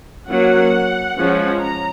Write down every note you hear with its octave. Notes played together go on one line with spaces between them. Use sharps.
F#3 A#3 C#4 F#5
F3 G#3 C#4
A#5